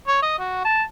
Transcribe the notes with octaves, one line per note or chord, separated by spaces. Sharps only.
C#5
D#5
F#4
A5